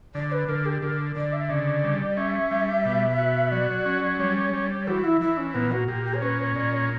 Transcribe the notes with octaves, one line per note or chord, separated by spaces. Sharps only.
D3 D5
B4
D3 A#4
G4
D3 A#4
D3 D5
E5
C#3 D5
G3
C#4 E5
G3
B2
F#4
F#3 D5
C#4
G3 C#5
G3
E3 F#4
E4
E3 E4
C#4
A#2 B3
F#4
A#2 G4
G4
C#5
C#4 B4
C#5
A#2 D5
C#5